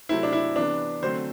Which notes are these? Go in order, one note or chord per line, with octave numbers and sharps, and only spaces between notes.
C3 F#3 A3 C4 E4
D4
E4
C3 E3 B3 D4
D3 F#3 A3 C4 C5